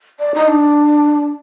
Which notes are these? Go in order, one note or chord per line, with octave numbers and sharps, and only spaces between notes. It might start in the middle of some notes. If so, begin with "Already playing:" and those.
D5
D#4
D4